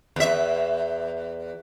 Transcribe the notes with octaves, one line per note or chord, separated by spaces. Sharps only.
E2 E5